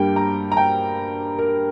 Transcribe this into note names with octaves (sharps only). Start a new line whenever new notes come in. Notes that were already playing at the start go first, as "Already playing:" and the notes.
Already playing: G2 G3 A#3 G5
A#5
A#5
G5
A#4